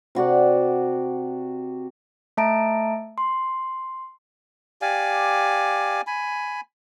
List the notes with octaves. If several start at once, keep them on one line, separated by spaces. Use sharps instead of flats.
C3 F#4 D5 F#5
A3 E5 A5 A#5 D7
C6
G4 D5 F5 G#5
G#5 B5